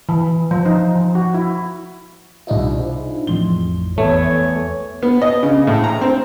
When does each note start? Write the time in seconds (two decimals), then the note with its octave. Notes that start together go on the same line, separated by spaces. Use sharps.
0.09 E3
0.51 F3
0.65 D#4
0.95 F3
1.15 F#4
1.34 E4
2.47 C2 D4 D#4 F4 D#5 E5
2.78 E4 G#4 C5
3.27 A1 F2 A2 C6 G7
3.98 E2 E3 A3 C#5
5.02 B3
5.22 D#5
5.43 C#3
5.67 A2
5.84 A#5
6.01 C4